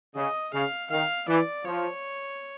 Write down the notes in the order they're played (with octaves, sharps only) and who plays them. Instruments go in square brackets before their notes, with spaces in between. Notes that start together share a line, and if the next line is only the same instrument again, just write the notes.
[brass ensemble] C#3 [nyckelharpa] D#5
[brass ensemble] C#3 [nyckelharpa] F5
[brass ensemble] D#3 [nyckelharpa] F5
[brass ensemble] E3 [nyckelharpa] D5
[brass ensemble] F3 [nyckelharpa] C#5